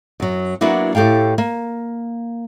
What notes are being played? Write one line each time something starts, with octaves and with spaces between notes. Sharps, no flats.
F#2 F#3
F#3 A#3 B3 D4 E4 F#4
A2 G4 A4 F5 G5
A#3